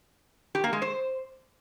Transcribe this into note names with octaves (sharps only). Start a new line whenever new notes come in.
G4
A#3
G#3
C5